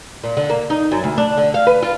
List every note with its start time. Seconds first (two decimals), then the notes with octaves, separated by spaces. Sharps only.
0.23 A#2
0.37 D3
0.50 A#3
0.70 D#4
0.92 F#2
1.04 D2
1.18 D4
1.37 D3
1.54 F5
1.67 B4
1.82 F4